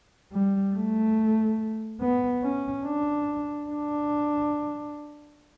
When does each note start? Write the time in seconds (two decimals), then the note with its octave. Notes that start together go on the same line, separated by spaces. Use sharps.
0.33 G3
0.74 A3
2.00 B3
2.43 C#4
2.85 D4
3.69 D4